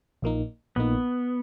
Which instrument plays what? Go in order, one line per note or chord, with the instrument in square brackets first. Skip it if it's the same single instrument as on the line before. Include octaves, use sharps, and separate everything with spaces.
[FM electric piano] A#1 A#2 A#3 D#4
[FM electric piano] A#1 A#2 A#3 D#4 [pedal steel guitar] B3